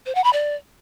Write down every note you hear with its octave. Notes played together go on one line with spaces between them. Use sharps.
C5
F#5
B5
D5